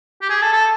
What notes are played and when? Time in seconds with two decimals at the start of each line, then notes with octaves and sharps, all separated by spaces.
0.22 G4
0.30 G#4
0.42 A4
0.53 A4